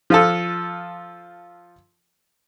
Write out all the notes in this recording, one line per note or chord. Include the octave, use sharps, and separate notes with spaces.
F3 F4 A4